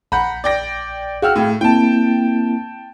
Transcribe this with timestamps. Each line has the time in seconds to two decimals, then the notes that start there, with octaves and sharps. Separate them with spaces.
0.12 A#1 F#5 A#5 B5 G6
0.44 D5 G5 A#6
1.22 F#4 G#4 F5 G5 E6 F6
1.36 A2
1.61 A#3 C4 E4 G5 A5